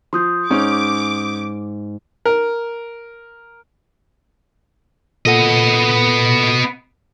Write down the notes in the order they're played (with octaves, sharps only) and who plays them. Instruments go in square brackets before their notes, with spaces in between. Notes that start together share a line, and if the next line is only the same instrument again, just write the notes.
[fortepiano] F3 [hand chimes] C6 D#6 G6
[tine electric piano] G#2 [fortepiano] C#4 D#4 [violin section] D6
[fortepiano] A#4
[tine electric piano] A#2 A4 F#5 [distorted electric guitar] B3 D#5